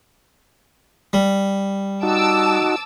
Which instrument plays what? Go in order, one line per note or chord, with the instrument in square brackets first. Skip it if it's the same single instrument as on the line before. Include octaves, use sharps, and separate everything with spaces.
[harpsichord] G3
[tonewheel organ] D#4 F#4 [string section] A5 D6 E6